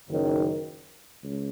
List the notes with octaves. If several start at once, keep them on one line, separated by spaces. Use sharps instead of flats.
F#1 F#2 D#3
C#2